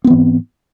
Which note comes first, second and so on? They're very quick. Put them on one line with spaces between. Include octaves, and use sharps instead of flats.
C4 B3 E3 G#2